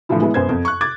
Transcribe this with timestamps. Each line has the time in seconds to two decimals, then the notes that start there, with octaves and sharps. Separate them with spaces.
0.09 A2 D3 E3 F3 E4
0.22 G#3 B3 E4
0.34 F#2 B3 C5 G#6
0.49 F2
0.65 C#6 F#6
0.81 D6 G#6 A6